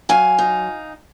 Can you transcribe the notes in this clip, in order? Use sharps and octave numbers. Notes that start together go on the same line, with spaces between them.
F#3 F5 G#5
D#4